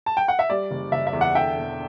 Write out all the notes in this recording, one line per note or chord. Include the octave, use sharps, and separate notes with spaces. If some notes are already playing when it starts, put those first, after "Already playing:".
A5
G5
F#5
E5
G3 D5
F#1
F#1 E5
E5
E2
F#5
D3 E5 G5
E1